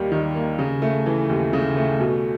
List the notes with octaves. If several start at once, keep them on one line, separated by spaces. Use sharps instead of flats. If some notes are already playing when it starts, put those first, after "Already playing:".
Already playing: D#2 D#3 G3 A#3
D#3
A#3
C#3
A3
E3
D#2
C#3
A3
B2